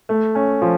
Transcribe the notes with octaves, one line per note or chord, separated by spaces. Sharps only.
A3
C#4
F3